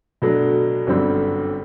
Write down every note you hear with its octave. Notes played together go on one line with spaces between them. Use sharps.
B2 F#3 A3 D4
G1 F#2 D3 G3 C4